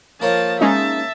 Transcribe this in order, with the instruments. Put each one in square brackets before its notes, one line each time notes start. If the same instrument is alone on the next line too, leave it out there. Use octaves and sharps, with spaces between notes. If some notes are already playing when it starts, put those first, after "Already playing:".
[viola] F3 A5 [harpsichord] A#3 C#5
[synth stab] G#3 C#4 D#4 [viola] E5 A5